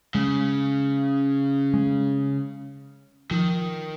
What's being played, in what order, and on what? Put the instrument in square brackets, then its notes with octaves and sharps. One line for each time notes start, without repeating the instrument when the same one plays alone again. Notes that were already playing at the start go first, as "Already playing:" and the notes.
[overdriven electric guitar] C#3 [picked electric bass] G#3
[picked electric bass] G#3
[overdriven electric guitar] D#3 [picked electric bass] F3